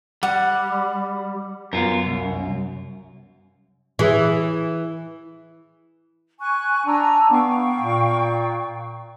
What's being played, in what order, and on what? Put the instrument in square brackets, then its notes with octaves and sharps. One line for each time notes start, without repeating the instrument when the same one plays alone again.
[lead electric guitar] G3 [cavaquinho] F#5
[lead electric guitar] F#2 [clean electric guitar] B3 F4 A#4
[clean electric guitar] C2
[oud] E3 [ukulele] G#4 E5
[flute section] G#5 C#6 F#6
[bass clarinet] D4 [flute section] G#5 A#5 E6
[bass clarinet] B3 [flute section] F5 G5 C#6
[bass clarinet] A#2